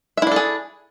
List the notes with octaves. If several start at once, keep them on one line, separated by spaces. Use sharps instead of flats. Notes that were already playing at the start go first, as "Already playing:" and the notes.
D4 E4 G#4 A4 E5